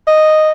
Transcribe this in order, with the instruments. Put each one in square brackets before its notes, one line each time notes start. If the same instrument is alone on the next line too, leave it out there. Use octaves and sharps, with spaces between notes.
[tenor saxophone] D#5